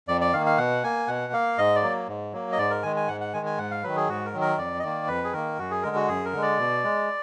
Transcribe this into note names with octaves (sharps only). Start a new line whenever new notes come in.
F2 D5
D5
D#3 A#3 F5
F5
B2 F#5
A#3 G#5
B2 F#5
A#3 F5
G#2 D#5
D5
F#3 A#3
G#2
F#3 A#3
D#5
G#2 D5
A#4
D#3 G#3 G#5
G#5
G#2 F#5
F#5
D#3 G#3 G#5
G#5
G#2 F#5
F5
D#3 F#3 B4
G#4
G#2 F#4
A#4
D#3 F#3
A#4
F2 D5
D#5
D#3 A#3 D5
F2 B4
G#4
D#3 A#3 A#4
F#2 F#4
G#4
D3 G#3 A#4
F#4
F#2 G#4
A#4
D3 G#3
D5
B2
G#3